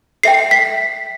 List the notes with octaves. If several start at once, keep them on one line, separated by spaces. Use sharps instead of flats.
A4 E5 G5 C7
B6